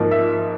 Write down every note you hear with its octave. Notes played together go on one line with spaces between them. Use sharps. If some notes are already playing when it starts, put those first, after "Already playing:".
Already playing: G#2 F3 A#3
E5